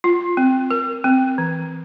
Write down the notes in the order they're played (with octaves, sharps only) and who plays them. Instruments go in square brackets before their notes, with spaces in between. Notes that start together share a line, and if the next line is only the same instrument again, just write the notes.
[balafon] F4
C4
A#4
C4
E3